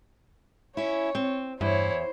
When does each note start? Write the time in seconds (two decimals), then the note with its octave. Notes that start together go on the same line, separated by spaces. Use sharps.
0.77 C#4 E4 C#5
1.15 C4
1.61 E2 G2 E4 C5 C#5